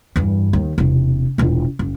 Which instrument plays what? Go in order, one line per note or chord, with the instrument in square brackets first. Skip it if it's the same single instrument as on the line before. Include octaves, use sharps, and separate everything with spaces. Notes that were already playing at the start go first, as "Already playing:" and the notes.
[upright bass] E2 G2
D#2
E1 C3
E1 A#1
F#1